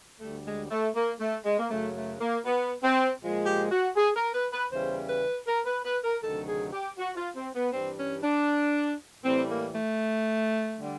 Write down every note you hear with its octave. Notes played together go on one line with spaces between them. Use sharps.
D2 D3 G3 A3
G#3
A3
A#3
A3
G#3
A#3
F#2 C#3 F#3 A3
A3
A#3
B3
C4
A#2 F3 G#3
G4
F#4
G#4
A#4
B4
B4
E2 C#3 E3 G3 C5
B4
A#4
B4
B4
A#4
D2 C3 D#3 F#3 A4
G#4
G4
F#4
F4
C4
B3
G2 E3 G3 C4
C#4
D4
A2 E3 G3 C4
A#3
A3
D3 G3